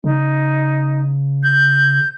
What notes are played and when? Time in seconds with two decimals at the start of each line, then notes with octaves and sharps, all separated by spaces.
0.04 C#3 D#4
1.43 G6